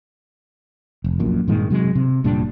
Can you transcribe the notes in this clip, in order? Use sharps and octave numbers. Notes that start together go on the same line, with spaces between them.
F1
A#1 F#2 A#2
G2 A#2 D#3 G#3
C3 F#3 G#3
C3
F1 A#2 G3 D4